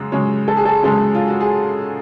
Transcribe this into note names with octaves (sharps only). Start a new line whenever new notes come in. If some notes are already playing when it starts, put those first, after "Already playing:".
Already playing: F#2 C#3 G#3
F#2 C#3 G#3 C#5
A4
G#4
A4
F#2 C#3 G#3 A4
F4
F#4
G#4